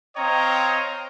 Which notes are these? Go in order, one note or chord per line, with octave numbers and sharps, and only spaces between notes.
C4 C#5 D#5 F5 G5 A#5